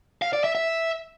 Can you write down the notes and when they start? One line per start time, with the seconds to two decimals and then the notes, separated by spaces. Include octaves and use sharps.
0.22 F5
0.33 D5
0.44 E5
0.55 E5